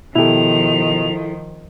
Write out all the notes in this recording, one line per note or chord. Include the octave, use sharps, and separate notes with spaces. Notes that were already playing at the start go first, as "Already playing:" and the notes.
B2 D#3 F3 E4 G4 A4 F7